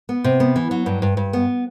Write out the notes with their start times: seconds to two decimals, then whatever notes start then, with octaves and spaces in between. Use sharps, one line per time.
0.09 B3
0.24 C3
0.40 B3
0.56 E3
0.71 F#3
0.86 G2
1.02 G2
1.17 G2
1.33 B3